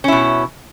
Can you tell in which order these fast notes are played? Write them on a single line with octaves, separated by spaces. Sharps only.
C#4 E4 B2